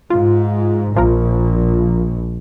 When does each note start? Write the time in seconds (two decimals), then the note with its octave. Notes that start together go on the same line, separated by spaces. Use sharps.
0.10 G#2 F4
0.96 A#1 F3 F4 A#4